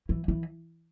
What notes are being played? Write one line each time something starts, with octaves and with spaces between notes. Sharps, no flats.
E3
E3